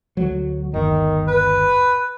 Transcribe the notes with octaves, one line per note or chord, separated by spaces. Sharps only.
D2 F#3
G1 D#2 D#3
B4